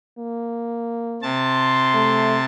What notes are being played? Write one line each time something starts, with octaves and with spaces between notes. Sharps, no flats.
A#3
C3 A5 C6
A3